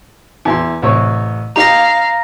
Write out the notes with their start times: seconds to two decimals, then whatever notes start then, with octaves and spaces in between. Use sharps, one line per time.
0.45 E2 E4 C6
0.82 A1 C3 C#5
1.56 D#4 G4 F5 A#5 A#6